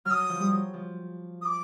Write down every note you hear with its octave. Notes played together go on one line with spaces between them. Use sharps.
F#3 F6
D#6
F3
G3
F#3
F3
D#6
D6